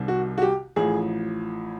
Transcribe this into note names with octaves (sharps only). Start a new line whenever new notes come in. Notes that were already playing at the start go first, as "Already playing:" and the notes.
Already playing: C2 C3 D#3
F#4
F#4
G4
A1 A2 F3 G#4